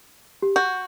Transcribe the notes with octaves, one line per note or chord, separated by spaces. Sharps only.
G4
F#4 G6